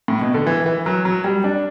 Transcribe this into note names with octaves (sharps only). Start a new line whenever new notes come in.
A2
B2
D3
E3
E3
F#3
F#3
G3
D4